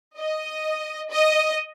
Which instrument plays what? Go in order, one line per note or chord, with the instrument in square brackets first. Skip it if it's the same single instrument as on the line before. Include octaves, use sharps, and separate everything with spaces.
[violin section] D#5
D#5